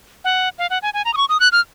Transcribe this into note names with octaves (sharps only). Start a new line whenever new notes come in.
F#5
F5
F#5
G#5
G#5
A#5
D#6
C#6
D#6
F#6
F6